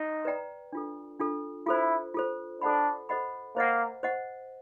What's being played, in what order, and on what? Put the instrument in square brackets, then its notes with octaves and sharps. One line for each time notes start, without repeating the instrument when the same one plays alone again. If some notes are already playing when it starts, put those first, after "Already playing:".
Already playing: [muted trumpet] D#4
[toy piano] B4 D5 G5 A#5
D4 F4 A4
D4 F4 A4
[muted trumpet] E4 [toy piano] F4 A4 C5
[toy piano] F4 A4 C5
[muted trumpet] D4 [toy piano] A4 C5 D#5 F#5 B5
[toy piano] A4 C5 D#5 F#5 B5
[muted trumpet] A#3 [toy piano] C5 D#5 F#5
[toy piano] C5 D#5 F#5